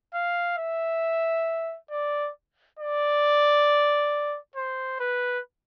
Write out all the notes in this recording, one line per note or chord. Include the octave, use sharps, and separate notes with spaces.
F5
E5
D5
D5
C5
B4